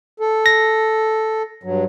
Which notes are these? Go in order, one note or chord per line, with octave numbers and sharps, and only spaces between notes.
A4
A#6
G2 F#3